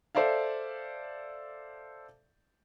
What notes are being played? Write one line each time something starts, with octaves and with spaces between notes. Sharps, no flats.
A4 C5 D5 E5 F5